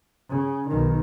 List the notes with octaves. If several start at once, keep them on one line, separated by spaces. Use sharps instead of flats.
C#3
B1 D#3